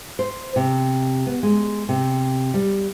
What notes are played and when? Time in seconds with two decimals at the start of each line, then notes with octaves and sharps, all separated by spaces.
0.19 C5
0.56 C3
1.26 B3
1.43 G#3
1.89 C3
2.54 G3